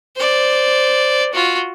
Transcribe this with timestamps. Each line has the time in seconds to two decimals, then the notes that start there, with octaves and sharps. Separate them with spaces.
0.16 C5 D5
1.34 F4 F#4